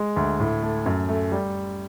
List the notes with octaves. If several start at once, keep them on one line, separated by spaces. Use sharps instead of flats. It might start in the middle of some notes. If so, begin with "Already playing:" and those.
Already playing: G#3
D2
A2
A3
F#2
A3
G3